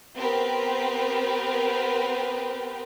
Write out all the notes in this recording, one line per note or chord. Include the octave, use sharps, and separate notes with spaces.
B3 C4 G4 A#4 B4